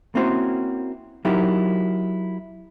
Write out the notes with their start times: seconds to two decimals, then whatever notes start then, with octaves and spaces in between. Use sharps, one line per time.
0.15 A#3 C4 C#4 E4 F#4 C5
1.25 F#3 D#4 E4 G4 A#4